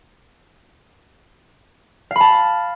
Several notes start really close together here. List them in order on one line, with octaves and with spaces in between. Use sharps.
F5 B5 A5